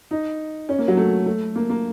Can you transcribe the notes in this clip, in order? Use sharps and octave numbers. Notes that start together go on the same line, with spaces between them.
D#4
C#4
A#3
F#3
A3
A3
A#3
A#3